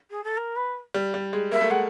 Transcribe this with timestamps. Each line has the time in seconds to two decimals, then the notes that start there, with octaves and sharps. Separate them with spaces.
0.10 G#4
0.24 A4
0.37 A#4
0.56 B4
0.94 G3
1.14 G3
1.33 G#3
1.52 A#3 E5
1.61 A3
1.70 G#3 F#5